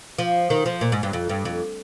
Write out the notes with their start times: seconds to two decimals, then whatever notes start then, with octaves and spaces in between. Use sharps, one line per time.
0.18 F3
0.50 D#3
0.66 F3
0.81 A#2
0.92 G#2
1.03 G2
1.13 F2
1.29 G2
1.45 F2